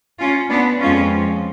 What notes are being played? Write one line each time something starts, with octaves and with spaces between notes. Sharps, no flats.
C#4 F4
B3 D4
F2 F3 G#3 C#4 F4